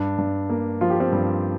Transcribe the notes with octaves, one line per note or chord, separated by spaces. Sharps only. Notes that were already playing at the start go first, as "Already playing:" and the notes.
Already playing: G2 D4
G2
A#3
F3 F4
G4
C4 F4
G2